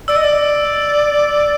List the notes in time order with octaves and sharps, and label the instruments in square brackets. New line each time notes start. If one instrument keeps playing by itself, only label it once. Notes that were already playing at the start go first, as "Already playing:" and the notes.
[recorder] D5 [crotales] E6
[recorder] D#5
D5